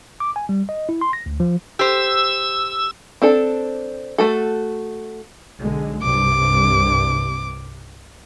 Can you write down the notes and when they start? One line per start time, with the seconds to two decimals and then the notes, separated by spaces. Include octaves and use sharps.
0.20 D6
0.36 G#5
0.49 G3
0.69 D#5
0.89 E4
1.01 C6
1.13 A#6
1.26 D2
1.40 F3
1.79 G4 C5 E6
3.22 C4 D4 A4
4.18 A3 F#4 A4
5.61 B1 D3 G#3
6.03 C2 G2 C3 D6